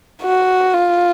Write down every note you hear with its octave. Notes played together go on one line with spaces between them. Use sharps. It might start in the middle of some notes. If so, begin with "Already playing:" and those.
F#4
F4